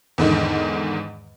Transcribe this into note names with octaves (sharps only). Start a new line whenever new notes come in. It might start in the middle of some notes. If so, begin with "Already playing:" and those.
E2 G#2 D3 D#3